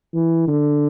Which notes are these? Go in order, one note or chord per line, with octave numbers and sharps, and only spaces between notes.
E3
D3